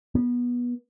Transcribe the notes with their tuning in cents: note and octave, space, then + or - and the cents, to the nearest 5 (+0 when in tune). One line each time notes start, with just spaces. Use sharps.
B3 -20